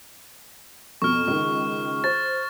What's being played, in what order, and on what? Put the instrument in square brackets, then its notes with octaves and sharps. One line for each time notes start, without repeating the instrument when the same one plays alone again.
[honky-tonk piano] F2 B2 [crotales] C#6 F6
[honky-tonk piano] C#2 D#3
[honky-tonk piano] C5 [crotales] A6